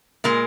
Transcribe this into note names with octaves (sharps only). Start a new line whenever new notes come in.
A#2 G#3 A#3 A#4